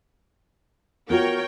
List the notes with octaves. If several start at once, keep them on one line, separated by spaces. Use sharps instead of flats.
B3 F4 F#4 A#4 C#5 G5